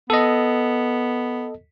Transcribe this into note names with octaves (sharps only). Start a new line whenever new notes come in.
B3 A4 D#5